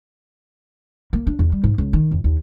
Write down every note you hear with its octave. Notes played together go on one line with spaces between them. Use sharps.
A#3
D4
E2
G3
G#2
C#2
D#3
F2
D#2